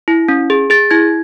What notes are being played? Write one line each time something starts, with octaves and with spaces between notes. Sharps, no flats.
E4
C#4
G#4
G#4 A6
E4 G#6